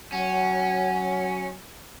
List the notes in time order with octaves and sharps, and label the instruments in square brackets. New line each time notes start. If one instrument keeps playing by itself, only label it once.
[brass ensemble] F#3 [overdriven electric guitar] C#4 [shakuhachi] F#5